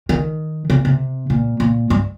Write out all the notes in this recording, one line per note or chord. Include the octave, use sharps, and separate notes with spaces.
D#3
C3
C3
A#2
A#2
G2